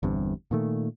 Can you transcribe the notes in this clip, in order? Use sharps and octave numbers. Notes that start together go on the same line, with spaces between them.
G1 E2 G2 C3
A#2 D#3 A3